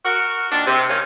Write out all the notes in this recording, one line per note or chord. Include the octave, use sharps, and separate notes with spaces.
F#4 A#4
A#2 D#3 D4
C3
D#3 A#3 C#4